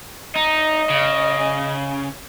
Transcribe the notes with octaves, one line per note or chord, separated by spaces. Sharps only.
D#4 D#5
C#3